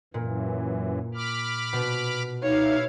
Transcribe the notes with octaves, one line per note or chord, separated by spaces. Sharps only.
F#2 A#2 E3
B5 D6 F6
B2
D#4 E4 C#5 F5